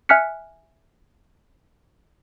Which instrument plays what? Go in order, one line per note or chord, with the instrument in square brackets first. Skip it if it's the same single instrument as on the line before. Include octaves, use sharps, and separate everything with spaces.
[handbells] E5 G#5 F6 F#6 B6 C#7